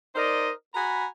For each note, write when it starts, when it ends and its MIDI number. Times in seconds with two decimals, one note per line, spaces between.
0.16 0.52 63
0.16 0.52 70
0.16 0.52 72
0.16 0.52 74
0.16 0.52 75
0.75 1.07 66
0.75 1.07 80
0.75 1.07 82
0.75 1.07 83